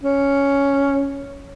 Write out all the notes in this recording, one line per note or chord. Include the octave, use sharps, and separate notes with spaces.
C#4